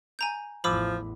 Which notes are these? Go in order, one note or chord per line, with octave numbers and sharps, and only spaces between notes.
G#5 A#5 G6
A1 E2 F3 B5 D6 E6